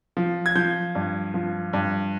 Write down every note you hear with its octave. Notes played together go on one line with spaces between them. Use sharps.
F3
G#6
F3 G6
G2
F3
G2